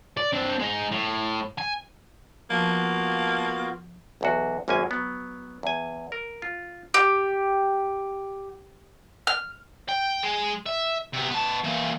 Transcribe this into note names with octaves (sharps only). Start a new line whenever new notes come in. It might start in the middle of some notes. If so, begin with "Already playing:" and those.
D5
C4 D4
G#3 D#4
A2
G#5
F3 A#3 B3 F4 F#4
B1 E2 F#4
G#1 F#2 A#3 C#4 G#5
F#3 B3
E2 G#5
A#4
F4
G4
F6
G5
G#3
E5
C3 B3
B3 A5
E3 A#3